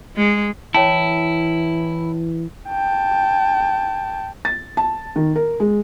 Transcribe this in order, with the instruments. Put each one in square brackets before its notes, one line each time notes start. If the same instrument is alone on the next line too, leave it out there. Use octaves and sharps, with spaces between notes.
[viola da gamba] G#3
[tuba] E3 [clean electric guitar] E4 [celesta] C#5 G5 A5
[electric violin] G5 A5
[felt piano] A6
A5
D#3
A#4
G#3